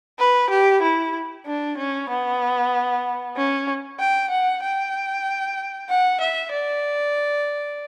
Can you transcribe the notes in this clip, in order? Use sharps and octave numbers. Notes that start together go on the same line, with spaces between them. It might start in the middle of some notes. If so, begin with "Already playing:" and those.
B4
G4
E4
D4
C#4
B3
C#4
G5
F#5
G5
F#5
E5
D5